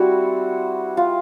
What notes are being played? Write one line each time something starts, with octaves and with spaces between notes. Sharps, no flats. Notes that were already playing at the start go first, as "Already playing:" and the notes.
Already playing: G3 C4 E4 F#4
F4